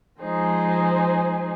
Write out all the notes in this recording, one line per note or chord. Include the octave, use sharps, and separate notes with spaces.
F3 G#3 D#4 G#4 C5